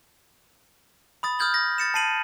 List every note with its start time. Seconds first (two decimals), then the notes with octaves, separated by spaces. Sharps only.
1.23 B5 D#6 A6
1.39 D#6 F6 G6 G#6 F#7
1.54 A#6
1.78 A6 C#7 E7
1.94 A5 C7 D#7 F#7